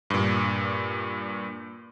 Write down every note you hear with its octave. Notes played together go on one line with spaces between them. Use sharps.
G2 A#2